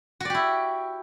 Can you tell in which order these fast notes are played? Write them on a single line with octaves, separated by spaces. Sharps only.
F#4 D5 G4 E4